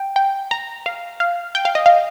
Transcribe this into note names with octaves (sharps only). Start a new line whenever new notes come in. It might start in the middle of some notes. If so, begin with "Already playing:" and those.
Already playing: G5
G5
A#5
F5
F5
G5
F5
D#5
F5